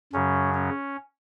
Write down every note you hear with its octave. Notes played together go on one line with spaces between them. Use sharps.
F#2 C#3 F#3 C#4
C#4